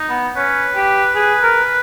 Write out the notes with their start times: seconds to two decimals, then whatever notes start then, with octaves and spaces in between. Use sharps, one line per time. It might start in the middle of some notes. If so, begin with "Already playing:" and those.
Already playing: D#4
0.10 B3
0.36 C#4 B4
0.76 G4
1.15 G#4
1.43 A#4